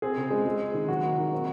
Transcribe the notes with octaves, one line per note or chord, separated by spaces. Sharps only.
C4 G#4
C#3
G#3
G#3
C4
D#3
F#3 F#4
A#3
D#3
C4